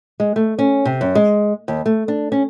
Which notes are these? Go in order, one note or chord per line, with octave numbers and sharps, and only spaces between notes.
G#3
A3
C#4
C3
F#2
G#3
D#2
A3
D4
C#4